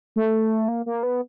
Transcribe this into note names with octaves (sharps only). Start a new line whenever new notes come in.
A3
A#3
A#3
B3